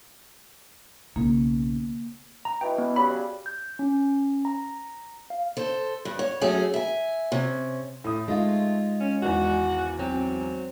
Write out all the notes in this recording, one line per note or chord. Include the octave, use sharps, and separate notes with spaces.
B1 C#3 A#3
A#5
B2 E3 G5
B3
C#3 F#3 G3 B5
G6
C#4
A#5
F5
A4 C5
G2
C#5
F#2 A3 C#4 G#4 G#5
E5 G#5
C3 C#4
A2 A3 D#6
G#3 D#4 F4
C#4
G#1 E2 F#4
F#3 C4